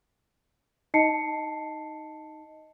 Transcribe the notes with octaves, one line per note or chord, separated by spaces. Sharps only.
D#4 D#5 A5 C7 C#7